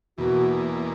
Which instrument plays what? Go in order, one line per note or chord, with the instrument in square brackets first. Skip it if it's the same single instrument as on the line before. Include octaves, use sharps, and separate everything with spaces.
[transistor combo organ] E2 B2 A#3 [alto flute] F#4